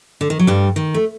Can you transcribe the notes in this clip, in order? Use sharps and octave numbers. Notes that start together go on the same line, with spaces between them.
D3
D#3
F#3
G2 G3
D#3
A3